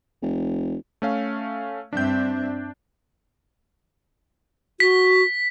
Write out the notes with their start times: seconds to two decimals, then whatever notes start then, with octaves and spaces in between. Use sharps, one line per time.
0.22 F1
1.02 A3 C#4 F5
1.93 G2 C4 D4 E5 G6
4.80 F#4 B6